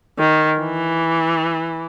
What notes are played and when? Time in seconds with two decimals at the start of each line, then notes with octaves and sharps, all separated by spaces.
0.19 D#3
0.60 E3